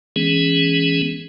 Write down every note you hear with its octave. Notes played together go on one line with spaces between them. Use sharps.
E3 G#3 B3 C#4 G#4